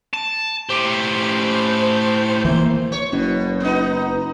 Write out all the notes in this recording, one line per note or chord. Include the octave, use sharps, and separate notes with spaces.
A5
A2 G4 C5
E3 A#3 C5
C#5
F#1 B2
B3 D#4